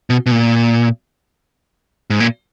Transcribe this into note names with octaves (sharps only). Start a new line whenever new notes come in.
B2
B2
A#2
G#2
A#2